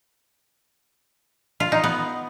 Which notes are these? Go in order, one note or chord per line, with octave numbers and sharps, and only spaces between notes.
F4
D#4
B3